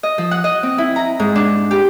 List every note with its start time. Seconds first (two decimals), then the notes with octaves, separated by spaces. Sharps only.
0.03 D#5
0.18 F3
0.31 F#5
0.44 D#5
0.63 C4
0.78 E4
0.96 A#5
1.20 G#2
1.36 D4
1.71 G4